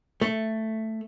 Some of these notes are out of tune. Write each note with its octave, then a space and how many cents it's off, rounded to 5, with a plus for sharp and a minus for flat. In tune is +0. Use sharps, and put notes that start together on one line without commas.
A3 +5